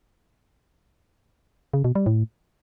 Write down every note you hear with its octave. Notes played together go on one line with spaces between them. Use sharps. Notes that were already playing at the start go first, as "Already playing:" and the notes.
C#3
B2
G3
A2